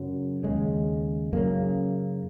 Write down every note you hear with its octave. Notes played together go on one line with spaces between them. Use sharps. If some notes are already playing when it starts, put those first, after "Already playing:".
Already playing: F#2 C#3 F#3
D#2 C#3 G#3
F#2 C#3 A#3